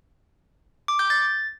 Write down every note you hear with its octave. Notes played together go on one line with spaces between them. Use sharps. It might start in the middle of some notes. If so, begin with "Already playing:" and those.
D6
G6
A6